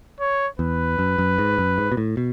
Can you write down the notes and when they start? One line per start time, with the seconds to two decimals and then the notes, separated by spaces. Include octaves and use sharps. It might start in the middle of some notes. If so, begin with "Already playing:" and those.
0.20 C#5
0.59 E2 B4
0.99 F#2
1.18 F#2
1.38 G#2
1.58 F#2
1.78 G#2
1.92 B2
1.97 A2
2.17 B2